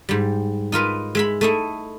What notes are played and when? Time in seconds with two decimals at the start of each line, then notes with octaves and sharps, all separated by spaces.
0.09 G#2 G3
0.72 D#4 F4 A#4 B4
1.15 G#3 E5 B5
1.41 A3 D#4 E4